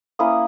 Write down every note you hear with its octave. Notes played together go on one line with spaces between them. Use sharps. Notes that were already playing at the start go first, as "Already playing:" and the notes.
A#3 C#4 E4 D#6